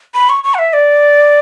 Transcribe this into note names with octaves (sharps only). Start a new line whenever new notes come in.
B5
C#6
C#6
F#5
E5
D5